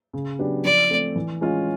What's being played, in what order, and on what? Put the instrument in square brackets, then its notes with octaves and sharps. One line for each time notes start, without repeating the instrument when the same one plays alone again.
[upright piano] C#3
F#3 B3 D4 G4
[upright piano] F3 [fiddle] D5
[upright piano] A3 C4
E3
G#3 C#4 F4